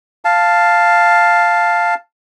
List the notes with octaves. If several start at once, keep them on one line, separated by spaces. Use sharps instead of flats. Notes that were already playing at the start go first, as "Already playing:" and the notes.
F5 A5